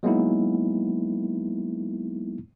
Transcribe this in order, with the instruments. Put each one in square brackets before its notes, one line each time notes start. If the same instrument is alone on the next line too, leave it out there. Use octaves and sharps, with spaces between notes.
[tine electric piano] F#3 G#3 A#3 B3 D#4 E4